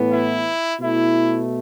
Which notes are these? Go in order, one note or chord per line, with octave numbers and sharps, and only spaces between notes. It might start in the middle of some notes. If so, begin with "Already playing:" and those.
Already playing: A2 E3 B3
E4
B2 A3 E4